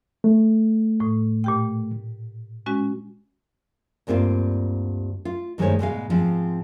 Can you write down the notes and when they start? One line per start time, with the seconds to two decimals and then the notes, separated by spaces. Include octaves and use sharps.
0.24 A3
1.00 A2
1.44 A#2 G4 G5
2.66 G#3 C#4 F#4
4.07 D2 G2 A#3 C4 F4
5.25 F4
5.58 G2 D#3 G#3 A3 C5 C#5
5.79 G#2 B2 G#3 F5
6.10 G#2 F3 C4